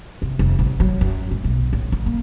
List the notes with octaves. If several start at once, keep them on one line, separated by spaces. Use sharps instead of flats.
C3
F1
A1
F#3
F#2
A2
B1
A2
D3
A#3